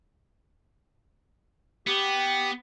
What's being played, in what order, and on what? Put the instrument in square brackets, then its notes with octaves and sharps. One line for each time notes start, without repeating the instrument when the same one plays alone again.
[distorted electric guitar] B3 [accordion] G4